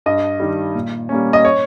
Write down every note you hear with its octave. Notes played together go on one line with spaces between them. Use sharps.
G2 D#5
D#3 G3
A#2
G3 A#3 C#4
D#5
C#5